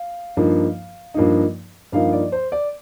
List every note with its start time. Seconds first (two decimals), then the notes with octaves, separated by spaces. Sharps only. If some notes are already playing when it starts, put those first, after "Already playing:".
Already playing: F5
0.37 G2 F3 A#3 D#4
1.14 G2 F3 A#3 D#4
1.92 G2 F3 A#3 D#4 F5
2.13 D5
2.32 C5
2.52 D5